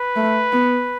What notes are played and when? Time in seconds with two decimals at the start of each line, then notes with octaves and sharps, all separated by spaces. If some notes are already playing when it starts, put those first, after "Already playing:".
Already playing: B4
0.16 A3
0.52 B3